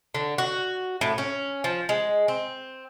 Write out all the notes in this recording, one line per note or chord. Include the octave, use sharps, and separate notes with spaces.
D3
F#4
A2
C#4
F3
G#3
C4